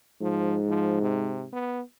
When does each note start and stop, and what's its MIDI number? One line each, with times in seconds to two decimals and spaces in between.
0.21 1.49 44
0.21 0.59 53
0.68 1.00 53
1.01 1.45 48
1.52 1.81 59